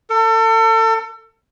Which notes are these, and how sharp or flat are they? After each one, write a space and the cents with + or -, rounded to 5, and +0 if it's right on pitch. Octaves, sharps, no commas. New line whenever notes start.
A4 +35